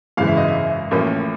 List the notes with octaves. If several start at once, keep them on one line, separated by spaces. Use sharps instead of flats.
G#1 F#2 C#3 E3 F5
E5
D#5
E5
A1 A2 F3 A#3 C#4